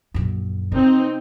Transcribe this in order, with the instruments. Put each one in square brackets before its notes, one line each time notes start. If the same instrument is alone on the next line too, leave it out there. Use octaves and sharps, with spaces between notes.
[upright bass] A#1 F#2
[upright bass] C3 [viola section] C4 D#4